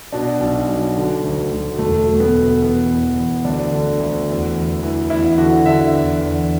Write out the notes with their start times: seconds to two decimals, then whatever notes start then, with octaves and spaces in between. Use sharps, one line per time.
0.12 B2 D4
0.40 B1
0.68 F#3
0.96 D3
1.24 D2
1.51 D2
1.79 E1 A3
2.07 F#3
2.15 A3
2.20 B3
2.34 B2
2.62 E2 B3
2.90 E2
3.17 E2
3.45 D2 D4
3.73 D3
4.00 D2
4.28 E2
4.55 E2
4.83 E3
5.10 E2 E4
5.37 D3 F#4
5.65 D3 E5
5.93 E2
6.21 E2